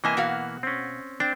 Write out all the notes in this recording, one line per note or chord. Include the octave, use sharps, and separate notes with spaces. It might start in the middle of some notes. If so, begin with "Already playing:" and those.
C3 E3 A#3 D#5 E5 G#5
B2 F#4 F5
C4 C#4
C4 D4